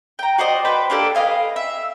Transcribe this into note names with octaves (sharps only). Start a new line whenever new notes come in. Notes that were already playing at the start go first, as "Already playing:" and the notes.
G5 A#5
F#4 C5 D5 D#5
B4 C5 G5
A#3 D4 G4 A4
B4 D#5 F5 G#5
E5